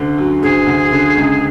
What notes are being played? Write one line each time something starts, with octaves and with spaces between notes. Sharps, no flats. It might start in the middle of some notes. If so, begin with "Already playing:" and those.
Already playing: D2 D3
F#3
D2 G#4
D2
D3
C#2